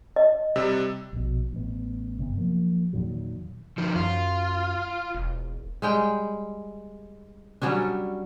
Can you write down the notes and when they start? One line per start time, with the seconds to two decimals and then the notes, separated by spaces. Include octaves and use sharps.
0.16 D#5
0.56 C3 G3 E6
1.13 A#1 B2
1.53 A1 B3
2.18 F#1 G2 C3 B3
2.38 F3 F#3 A#3
2.93 E2 A#2 D#3 F#3
3.78 D#3 F3
3.96 F#2 F4
5.15 E1
5.82 G3 G#3 G5
7.62 F#3 G3 C#4 D4